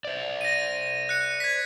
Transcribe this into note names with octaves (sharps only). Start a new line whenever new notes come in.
C5 D5
A#6 D#7
F#6 C#7
G#6 B6